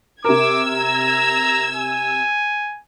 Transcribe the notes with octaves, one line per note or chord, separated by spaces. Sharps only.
C3 A#4 D6 E6 G#6
A#5
G#5